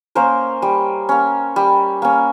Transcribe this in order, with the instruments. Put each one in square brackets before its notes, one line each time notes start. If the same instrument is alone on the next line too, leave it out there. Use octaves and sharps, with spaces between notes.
[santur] A#3 C#4 A#4 C5
G3
A#3 C#4
G3
A#3 C#4